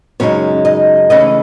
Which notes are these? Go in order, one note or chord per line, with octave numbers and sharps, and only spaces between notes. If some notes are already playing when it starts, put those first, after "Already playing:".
F#2 C#3 G#3 C#4 D#4 C#5
D#4 D#5
C#3 E3 A3 C#4 D#4 D#5